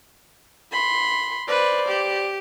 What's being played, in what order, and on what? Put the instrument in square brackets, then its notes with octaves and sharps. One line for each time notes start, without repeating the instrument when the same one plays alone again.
[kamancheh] B5 C6
[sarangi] B4 [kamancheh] C5 D5
[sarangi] G4